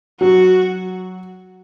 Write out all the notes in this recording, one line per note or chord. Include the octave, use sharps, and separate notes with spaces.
F#3 F#4